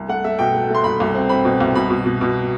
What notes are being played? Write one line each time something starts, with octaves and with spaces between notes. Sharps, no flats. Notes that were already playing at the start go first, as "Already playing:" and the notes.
Already playing: C2
A3 F#5
A3 E5
B2 G5
A3
A3 C6
C2 B5
C2
C4
C4 B5
B2
C2
B2 B5
B2
B2
B2